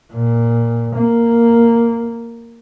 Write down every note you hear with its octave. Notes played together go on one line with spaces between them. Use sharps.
A#2
A#3